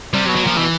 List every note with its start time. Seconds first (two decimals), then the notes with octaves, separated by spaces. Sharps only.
0.14 C3 G3
0.25 F#3
0.29 B2
0.35 F#3
0.43 A#2 F3
0.57 B2 E3